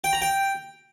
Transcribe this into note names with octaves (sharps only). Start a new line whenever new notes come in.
G5
A#5
G5